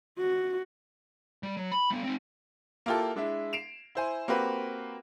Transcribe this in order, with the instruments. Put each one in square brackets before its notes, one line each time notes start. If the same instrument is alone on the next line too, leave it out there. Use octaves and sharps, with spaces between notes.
[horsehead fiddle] F#4
[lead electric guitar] G3
F#3
B5
G3 B3
C4 D#4
[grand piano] A#3 E4 F4 G4 A4
G#3 D4 E4 E5
C7 D7 E7 F7
E4 C5 G#5
A#3 C4 F#4 G4 B4